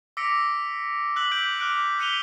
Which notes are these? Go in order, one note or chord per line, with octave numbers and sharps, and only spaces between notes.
D6 E6 A#6 B6 C#7 D7
E6 F#6 B6 F#7
D6 F#6 G6 B6 D7 F#7
D6 F6 F#6 D7
F#6 B6 C#7 D#7 F7 G7